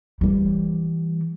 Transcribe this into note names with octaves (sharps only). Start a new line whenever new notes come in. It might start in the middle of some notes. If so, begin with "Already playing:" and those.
E3 G3